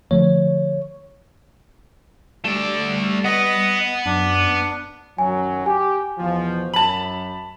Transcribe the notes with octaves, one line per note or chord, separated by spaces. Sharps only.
D3 F3 A3 C#5
G3 A3 D5
B3 B4 D#5 F#5
F#2 D4
F#2 D#3 F#3 G#5
G4 G#5
E2 B2 F3
F#2 A5 B5 F#7